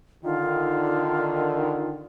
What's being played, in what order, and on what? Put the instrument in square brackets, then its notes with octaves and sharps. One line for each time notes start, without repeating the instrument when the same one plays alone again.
[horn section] D3 D#3 [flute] F4